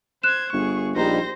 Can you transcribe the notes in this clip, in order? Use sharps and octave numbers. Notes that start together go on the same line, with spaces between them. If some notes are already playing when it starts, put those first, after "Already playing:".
C5 F#6 G#6 E7
G1 G#4 C#6
A#1 G3 D#4 C5 A#6